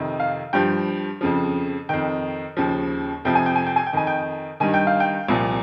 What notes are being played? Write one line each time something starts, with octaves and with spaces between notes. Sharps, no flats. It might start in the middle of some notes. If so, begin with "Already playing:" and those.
Already playing: F2 C3 D#3
F5
G2 F3 G5
F2 C#3 F3
F2 D#3 G5
D#2 C#3 F3
F2 C3 F3 G5
G#5
G5
G#5
G5
G#5
G5
F2 D#3 G#5
G5
G2 D#3 G#5
G5
F5
G5
C2 A#2 F3